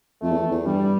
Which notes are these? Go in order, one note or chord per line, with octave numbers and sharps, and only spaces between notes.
F2 A3
E2
E2
G2 G3